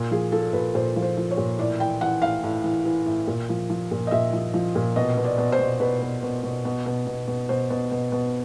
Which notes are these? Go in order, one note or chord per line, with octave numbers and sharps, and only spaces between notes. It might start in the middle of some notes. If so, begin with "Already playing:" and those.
Already playing: A#2
F3 G#4
F3 A4
A#2 B4
A#2 C5
F3
C5
F3
C#5
A#2
A2 D5
E3 G5
E3 F#5
A2 F5
A2
E3
E3
A2
A#2
F3
F3
A#2
D#5
A#2 E5
F3
F3
A#2
B2 D#5
B2
D5
B2
C5
B2
B2 B4
B2
B2
B2
B2
B2
B2
B2
B2 C5
B2
B2
B2